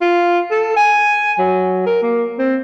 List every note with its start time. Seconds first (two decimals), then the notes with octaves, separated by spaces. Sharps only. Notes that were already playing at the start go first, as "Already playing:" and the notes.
0.01 F4
0.51 A4
0.77 G#5
1.39 F#3
1.86 A#4
2.03 A#3
2.39 C4